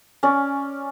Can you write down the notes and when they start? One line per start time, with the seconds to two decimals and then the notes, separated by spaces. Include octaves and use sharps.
0.23 C#4 D5